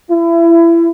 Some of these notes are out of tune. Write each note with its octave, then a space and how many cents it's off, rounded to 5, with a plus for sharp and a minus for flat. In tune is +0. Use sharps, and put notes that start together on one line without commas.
E4 +30